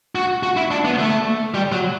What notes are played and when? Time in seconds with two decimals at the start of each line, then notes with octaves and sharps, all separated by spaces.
0.15 F#4
0.43 F#4
0.57 E4
0.71 D4
0.85 B3
0.99 A3
1.54 G3
1.72 F#3